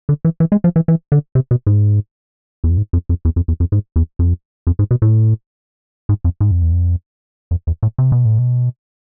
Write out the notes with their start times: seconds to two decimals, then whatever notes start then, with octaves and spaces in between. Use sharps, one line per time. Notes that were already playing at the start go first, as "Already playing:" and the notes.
0.09 D3
0.25 E3
0.40 E3
0.52 G#3
0.64 F3
0.76 E3
0.88 E3
1.12 D3
1.35 C3
1.51 B2
1.67 G#2
2.64 E2
2.70 F2
2.77 G#2
2.93 F2
3.09 F2
3.25 E2
3.36 F2
3.48 E2
3.60 F2
3.72 G#2
3.96 E2
4.19 F2
4.67 F2
4.79 G#2
4.91 B2
5.02 A2
6.09 G#2
6.24 F2
6.41 G#2
6.51 F2
6.62 E2
6.72 F2
7.51 F2
7.67 E2
7.83 A2
7.98 C3
8.12 B2
8.25 A2
8.39 B2